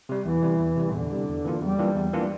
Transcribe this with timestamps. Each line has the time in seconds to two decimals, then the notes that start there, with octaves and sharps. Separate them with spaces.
0.09 C3 G3
0.26 E2 E3
0.43 C3 G3
0.60 E2
0.77 C3 G3
0.94 E2 D3
1.11 C3 G3
1.28 E2
1.45 E3 A#3 D4 F4
1.61 E2 G3
1.79 E3 A#3 D4 F4
1.96 E2
2.13 E3 A#3 D4 F4